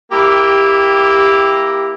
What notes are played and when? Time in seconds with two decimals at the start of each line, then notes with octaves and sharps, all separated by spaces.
0.11 A#3 E4 G4